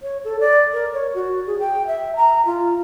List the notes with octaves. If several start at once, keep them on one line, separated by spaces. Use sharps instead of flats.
C#5
A4
D5
A#4
C#5
F#4
G#4
G5
E5
A#5
F4